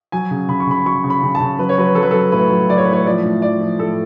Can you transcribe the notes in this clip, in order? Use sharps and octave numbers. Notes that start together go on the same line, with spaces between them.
F#3 G#5
C#3
C#3 B5
C#6
C#3 B5
F#3 C#6
C#3
B5
C#3
A5
C#3
F#3 B4
C#5
F#3 B4
F#3 A4
B4
F#3 A4
A2 B4
F#3
F#3 D5
C#5
A2 B4
C#5
F3 D5
A2
F3 D5
F3
A2 A4